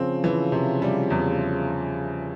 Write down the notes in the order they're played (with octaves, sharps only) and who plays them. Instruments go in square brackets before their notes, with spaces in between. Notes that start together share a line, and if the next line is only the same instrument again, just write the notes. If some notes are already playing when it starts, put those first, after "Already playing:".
Already playing: [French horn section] C#3 F3 [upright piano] C4
[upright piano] E3
C3
G3
E2